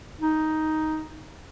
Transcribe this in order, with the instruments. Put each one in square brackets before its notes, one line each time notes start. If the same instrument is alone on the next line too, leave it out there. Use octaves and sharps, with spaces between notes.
[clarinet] D#4